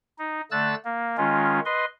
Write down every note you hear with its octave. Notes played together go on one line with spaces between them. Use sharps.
D#4
D3 A3 E6 F#6 A6
A#3
D#3 G#3 C#4 F4
B4 D#5 C6